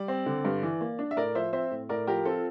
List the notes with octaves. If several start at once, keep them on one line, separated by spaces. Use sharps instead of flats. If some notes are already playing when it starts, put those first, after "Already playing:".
Already playing: G3 D5
C4
D3
G2
E3
A#3
D4
E5
A2 A#4 D5
F3 C5 E5
C4 C5 E5
A2
A2 A#4 D5
F3 G4 A#4
C4 F4 A4